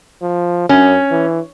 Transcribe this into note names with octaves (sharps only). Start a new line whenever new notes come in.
F3
F#2 C#4
E3